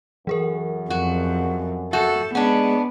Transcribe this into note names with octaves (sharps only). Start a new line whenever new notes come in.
F#2 E3 G#4 A#4
F2 F#4
F#4 A4 E5 G6 E7
G#3 B3 C#4 D4 F#5